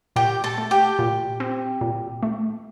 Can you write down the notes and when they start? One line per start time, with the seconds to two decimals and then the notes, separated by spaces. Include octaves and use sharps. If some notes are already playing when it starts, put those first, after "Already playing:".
0.16 A#2 G4 G5
0.44 A4 A5
0.58 A3
0.71 G4 G5
0.99 A#2
1.40 C4
1.81 A#2
2.23 A3